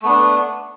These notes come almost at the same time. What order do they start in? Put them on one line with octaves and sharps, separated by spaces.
A3 B3 D4